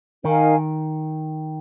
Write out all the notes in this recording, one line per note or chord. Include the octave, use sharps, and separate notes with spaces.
D#3 D#4 A#4 F5 G#5